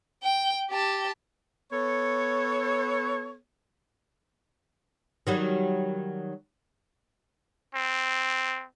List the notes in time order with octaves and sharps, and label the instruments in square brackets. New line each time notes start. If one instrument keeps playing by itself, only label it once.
[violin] G5
G4 A5
[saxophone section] B3 A4 C#5
[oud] D#3 F#3 G3
[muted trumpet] C4